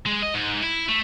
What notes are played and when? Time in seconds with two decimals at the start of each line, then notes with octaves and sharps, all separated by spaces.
0.06 G#3
0.23 D#5
0.34 G#2
0.63 E4
0.89 A3